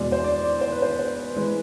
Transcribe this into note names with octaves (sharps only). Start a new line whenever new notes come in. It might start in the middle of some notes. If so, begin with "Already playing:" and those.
Already playing: E2 B2 G#3 D5
C5
D5
D5
C5
B4
C5
C5
E3 G#3 B4